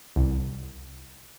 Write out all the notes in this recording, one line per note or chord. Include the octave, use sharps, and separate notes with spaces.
C2